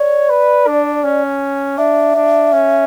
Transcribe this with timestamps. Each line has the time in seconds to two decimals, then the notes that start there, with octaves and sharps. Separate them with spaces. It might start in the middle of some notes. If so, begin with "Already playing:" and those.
Already playing: C#5 D5
0.29 B4
0.67 D4
1.04 C#4
1.78 D4 E5
2.15 D4
2.53 C#4